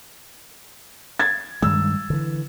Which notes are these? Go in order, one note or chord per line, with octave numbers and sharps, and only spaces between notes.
G#6 A6
G2 D#3 G#3 E6
D3 E3